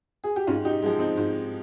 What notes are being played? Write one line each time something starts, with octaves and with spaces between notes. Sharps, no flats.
G#4
G4
G#2 C#4 F4
D#4 G4
F3 G#3
C4 D#4
G#2